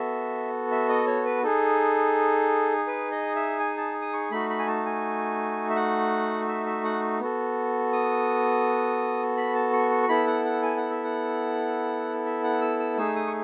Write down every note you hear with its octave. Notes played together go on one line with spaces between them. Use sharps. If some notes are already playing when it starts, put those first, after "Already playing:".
Already playing: B3 F#4 A4 E5
E5
D#5
C#5
B4
D#4 G#4 A4
B4
D#5
E5
G#5
A5
D#6
C#6
A3 D#4 F#4 B5
B5
G#5
A5
G#5
E5
F#5
E5
E5
F#5
B3 F#4 A4
D#6
B5
A5
C#6
C#6
C#6
B3 E4 A4 B5
F#5
F#5
G#5
F#5
E5
F#5
E5
F#5
E6
E6
A3 D#4 G#4 E6
D#6
C#6